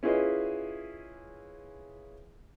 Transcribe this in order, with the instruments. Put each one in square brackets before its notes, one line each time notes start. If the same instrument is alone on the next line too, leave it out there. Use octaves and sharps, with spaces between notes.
[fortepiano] C#4 E4 F4 G#4 B4 D#5